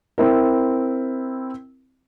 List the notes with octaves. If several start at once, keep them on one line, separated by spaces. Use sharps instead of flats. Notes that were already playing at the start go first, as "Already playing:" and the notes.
C4 E4 A#4